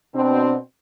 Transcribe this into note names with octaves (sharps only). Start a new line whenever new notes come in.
B2 C4 D4